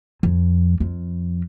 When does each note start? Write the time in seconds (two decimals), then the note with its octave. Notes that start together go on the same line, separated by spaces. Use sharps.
0.23 F2
0.80 F2